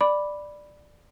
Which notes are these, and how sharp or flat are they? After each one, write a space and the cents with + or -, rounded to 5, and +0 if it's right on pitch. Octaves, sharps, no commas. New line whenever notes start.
D5 +10 B5 +0 D6 +0